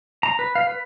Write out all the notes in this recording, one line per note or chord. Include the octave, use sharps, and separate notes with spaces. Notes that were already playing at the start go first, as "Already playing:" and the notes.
A#5
B4
F5
B4